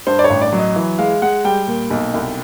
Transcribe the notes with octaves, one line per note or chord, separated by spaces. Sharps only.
G2 C5
D5
C#5
A1
D5
F#3
D#5
E3
G#3 F5
G#3 F#5
G3 G5
A#2
B1
C2